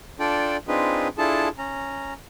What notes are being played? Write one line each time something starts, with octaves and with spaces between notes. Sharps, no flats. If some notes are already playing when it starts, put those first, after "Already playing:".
D4 F4 A4 D5 G5
C4 D4 D#4 F4 G#4 B4
D4 E4 F4 G#4 A4 A5
C#4 A#5